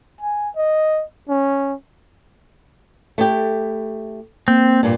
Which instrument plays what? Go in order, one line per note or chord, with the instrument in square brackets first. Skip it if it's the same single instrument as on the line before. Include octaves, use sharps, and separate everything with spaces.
[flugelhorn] G#5
D#5
C#4
[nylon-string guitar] A3 E4 G4
[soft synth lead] A#3 [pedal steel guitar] C4
[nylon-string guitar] G2 A#2